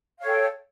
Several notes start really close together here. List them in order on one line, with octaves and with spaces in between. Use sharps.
F5 C#5 A4 G5